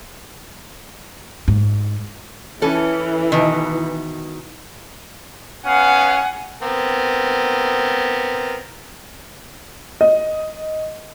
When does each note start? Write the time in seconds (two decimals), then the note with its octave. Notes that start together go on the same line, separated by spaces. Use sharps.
1.48 G#2
2.62 E3 C#4 A4
3.32 B2 D#3
5.66 B3 C#4 F5 F#5 G#5
6.63 B3 C4 A#4
10.01 D#5